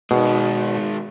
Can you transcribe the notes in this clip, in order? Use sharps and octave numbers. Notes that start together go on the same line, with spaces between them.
B2 D#3 G#3